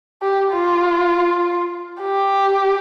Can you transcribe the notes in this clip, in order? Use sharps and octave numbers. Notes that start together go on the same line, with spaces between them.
G4
F4
G4